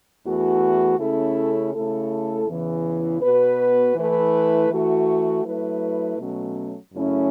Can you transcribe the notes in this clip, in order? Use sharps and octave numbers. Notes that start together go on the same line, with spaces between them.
E2 E3 A3 F#4
C#3 A3 C#4 E4 A4
C#3 A3 E4 A4
E2 C#3 E3
B2 B3 F#4 B4
E3 A3 E4 B4
E3 A3 F#4
F#3 A3 E4 B4
B2 F#3 A3 C#4
F#2 C#3 A3 C#4 E4